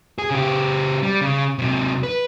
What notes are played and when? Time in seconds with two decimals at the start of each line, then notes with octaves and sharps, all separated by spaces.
0.18 G#4
0.31 C#3 G4
1.03 G3
1.21 C#3
1.59 C3 F#3
2.03 B4